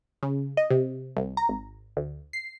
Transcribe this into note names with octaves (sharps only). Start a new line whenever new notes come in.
C#3
D#5
C3
C2
A#5
G#1
D2
C7